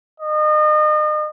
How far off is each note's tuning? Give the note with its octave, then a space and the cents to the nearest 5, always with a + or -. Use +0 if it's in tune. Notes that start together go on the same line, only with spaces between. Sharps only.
D#5 -35